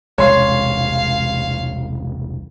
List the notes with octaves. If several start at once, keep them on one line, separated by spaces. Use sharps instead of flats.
E1 C2 G#3 C#5 F5 C6